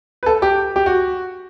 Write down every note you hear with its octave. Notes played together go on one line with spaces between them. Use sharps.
B4
A4
G4
G4
F#4